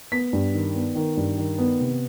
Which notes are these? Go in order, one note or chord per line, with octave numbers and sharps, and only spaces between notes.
B3 B6
G2
D#3
B3
D#3
G2
D#3
B3
C3